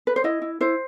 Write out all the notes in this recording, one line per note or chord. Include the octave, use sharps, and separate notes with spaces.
B4
C5
E4 D#5
E4
E4 C5